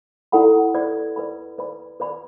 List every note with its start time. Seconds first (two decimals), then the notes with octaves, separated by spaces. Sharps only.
0.32 E4 A4 D5 F#5 B5
0.75 B4 D5 B5
1.16 B4 D5 B5
1.58 B4 D5 B5
2.00 B4 D5 B5